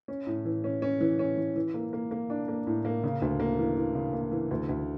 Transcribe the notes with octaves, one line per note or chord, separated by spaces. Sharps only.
C#4
A2
E3
C#4
C#4
E3
C#4
E3
E3
A#3
A#3
A#3
D4
A#3
A2
A#3
C#3
D2
A#3
E3
E3
C#3
A#3
E3
D2
D2